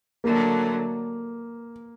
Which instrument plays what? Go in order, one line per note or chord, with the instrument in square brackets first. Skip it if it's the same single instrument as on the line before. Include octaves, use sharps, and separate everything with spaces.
[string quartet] D3 F#3 A3 [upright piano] A#3